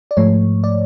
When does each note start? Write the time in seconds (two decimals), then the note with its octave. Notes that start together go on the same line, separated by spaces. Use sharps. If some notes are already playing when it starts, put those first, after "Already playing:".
0.11 D5
0.17 G#2 F3 A3 C#5
0.64 D5